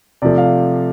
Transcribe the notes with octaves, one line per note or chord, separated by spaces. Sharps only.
C3 F3 A3 D5
F5